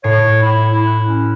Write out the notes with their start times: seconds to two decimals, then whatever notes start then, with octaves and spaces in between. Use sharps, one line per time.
0.04 A2 C#5 C7 D7
0.42 E4
0.72 E4
0.87 F#6
1.08 C#4